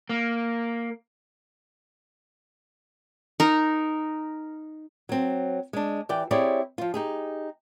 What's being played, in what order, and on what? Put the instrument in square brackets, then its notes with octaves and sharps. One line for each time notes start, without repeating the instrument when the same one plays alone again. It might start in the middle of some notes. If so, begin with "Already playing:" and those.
[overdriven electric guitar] A#3
[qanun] D#4 A#4
[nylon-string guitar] F#3 C4
G#3 D4
E3 G4 D5 G5
C4 E4 G4 G#4 C#5 D5
F3 F4
D#4 G4 G#4